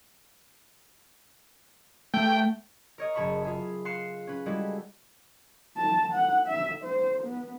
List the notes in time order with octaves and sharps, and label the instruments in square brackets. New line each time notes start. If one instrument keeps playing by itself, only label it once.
[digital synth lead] A3 [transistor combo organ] G5
[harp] A#4 C#5 D#5
F#1 G#4 A5 B5 C#6 C#7
F4 G#4 E5
F5 C6 F#6 C7 C#7 E7
C#4 B4
G3 G#3 E4 F#4 G#4 A4
[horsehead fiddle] A5
F#5
E5
C5
B3